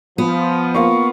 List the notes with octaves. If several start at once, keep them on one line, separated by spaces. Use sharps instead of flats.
F3 B3
A#3 F4 C#6